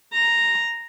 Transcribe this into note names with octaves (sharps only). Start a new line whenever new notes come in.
A#5